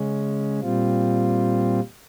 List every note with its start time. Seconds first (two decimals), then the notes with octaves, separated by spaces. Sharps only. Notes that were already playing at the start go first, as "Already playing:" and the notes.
Already playing: C#3 G#3 C#4
0.60 A#2 G3 C4 F4